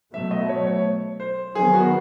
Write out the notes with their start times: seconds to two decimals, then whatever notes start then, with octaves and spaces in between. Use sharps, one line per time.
0.13 B2 F#3 A3 E5
0.31 D#5
0.49 C#5
0.67 C#5
1.20 C5
1.55 D#3 F#3 B3 G#4
1.74 F#4